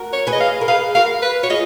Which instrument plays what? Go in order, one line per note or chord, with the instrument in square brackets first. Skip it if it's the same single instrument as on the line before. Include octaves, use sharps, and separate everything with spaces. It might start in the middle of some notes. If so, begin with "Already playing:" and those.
Already playing: [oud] F#4 A#4
[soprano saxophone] C#5
[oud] G#4 B4
[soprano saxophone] D#5
F5
[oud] A#4
[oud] G#4 B4 [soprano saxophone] F5
[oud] F#4 A#4 [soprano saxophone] F5
[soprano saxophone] B4
[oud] F#4 [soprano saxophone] C#5
[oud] F4 G#4 [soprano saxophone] D#5